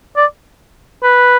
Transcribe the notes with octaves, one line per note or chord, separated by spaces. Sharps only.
D5
B4